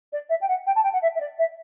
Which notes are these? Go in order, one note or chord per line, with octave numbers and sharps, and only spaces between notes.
D5
E5
G5
F#5
G5
A5
G5
F#5
E5
E5
D5
E5